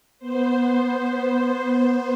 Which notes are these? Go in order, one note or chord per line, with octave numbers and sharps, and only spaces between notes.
B3 C5